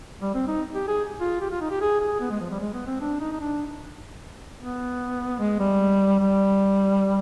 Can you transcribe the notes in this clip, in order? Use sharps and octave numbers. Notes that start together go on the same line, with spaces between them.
G3
C4
D#4
G4
G#4
F4
G4
F4
D#4
G4
G#4
G#4
B3
G#3
F3
G3
G#3
B3
C4
D4
D#4
D#4
D4
B3
G#3
G3
G3